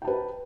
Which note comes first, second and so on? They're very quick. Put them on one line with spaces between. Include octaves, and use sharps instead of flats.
G5 A5 B4